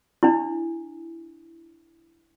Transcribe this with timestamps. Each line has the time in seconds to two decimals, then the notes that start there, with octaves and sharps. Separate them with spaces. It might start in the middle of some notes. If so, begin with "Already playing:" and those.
0.23 D4 E4